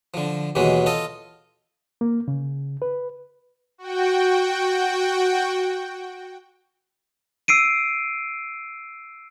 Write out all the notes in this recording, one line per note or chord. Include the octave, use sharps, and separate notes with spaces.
D3 F3
D#2 B2 E3 F#3 G#3
F4 A4 D#5
A#3
C#3
B4
F#4 G5
E6 C7 D7 D#7